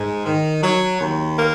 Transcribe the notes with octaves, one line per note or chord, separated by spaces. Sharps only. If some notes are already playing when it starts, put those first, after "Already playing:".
Already playing: G#2
D#3
F#3
D#2
A#3